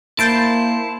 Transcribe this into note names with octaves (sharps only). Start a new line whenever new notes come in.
A#3 E4 C5 A5 G6 A6 D7